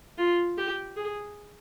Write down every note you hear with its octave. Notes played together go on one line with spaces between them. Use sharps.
F4
G4
G#4